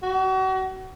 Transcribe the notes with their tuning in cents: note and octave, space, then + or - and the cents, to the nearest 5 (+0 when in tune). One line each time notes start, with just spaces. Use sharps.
F#4 +35